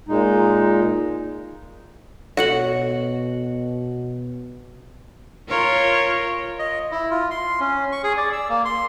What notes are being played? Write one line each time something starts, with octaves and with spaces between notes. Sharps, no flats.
A#2 G#3 D#4
B2 F#4 A4 C#5 C#7 F#7
F4 A#4 C#5
D#5
E4
F4
C6
C#4
C#6
G#4
D5
E6
A#3
C6